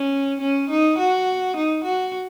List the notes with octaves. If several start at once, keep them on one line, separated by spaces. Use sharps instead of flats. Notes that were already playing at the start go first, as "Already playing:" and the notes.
Already playing: C#4
C#4
D#4
F#4
D#4
F#4